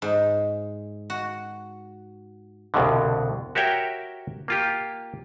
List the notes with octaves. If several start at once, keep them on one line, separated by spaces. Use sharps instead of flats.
G#2
F#4
C2 F2 B2 D3
F#4 G4 A#4 C#5 E5 G5
A#3 F4 G4